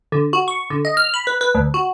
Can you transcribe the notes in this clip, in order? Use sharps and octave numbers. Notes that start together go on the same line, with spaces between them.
D3
F#4
C#6
D3
D#5
F6
B5
B4
B4
D2
F#4